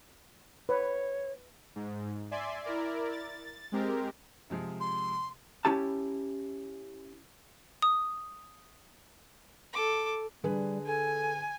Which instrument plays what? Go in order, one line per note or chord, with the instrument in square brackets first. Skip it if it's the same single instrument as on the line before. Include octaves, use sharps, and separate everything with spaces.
[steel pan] B4 [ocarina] C#5
[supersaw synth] G#2
D5 E5 G#5 C6
E4 A#4 D5
A6
G#3 C4 G4 A#4
[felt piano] C3 F3 G#3
[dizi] C6
[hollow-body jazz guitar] C#4 E4 G4 A5
[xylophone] D#6
[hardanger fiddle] A4 D6
[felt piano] D3 G#4 B4 [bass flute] G3
[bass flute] A4 [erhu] G#5